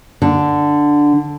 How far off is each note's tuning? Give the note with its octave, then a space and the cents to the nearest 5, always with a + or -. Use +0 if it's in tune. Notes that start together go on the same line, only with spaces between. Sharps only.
D3 +0